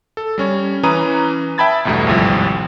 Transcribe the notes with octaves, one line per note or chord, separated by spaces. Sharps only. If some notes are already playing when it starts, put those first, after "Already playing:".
A4
G3 C#4 C#5
E3 C#4 B4 A#5 D#6 D#7
E5 G5 A5 B5 G#6 A6
B1 E2 G2 B2 A3
G#1 D2 A2 C3 F3 G3